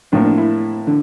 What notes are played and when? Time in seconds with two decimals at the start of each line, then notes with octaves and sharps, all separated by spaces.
0.12 A2 F3 A#3 D4
0.25 D4
0.38 E4
0.87 D3